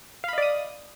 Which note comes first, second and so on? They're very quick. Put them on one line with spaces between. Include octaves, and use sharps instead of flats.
F5 B5 D#5 D5 D#6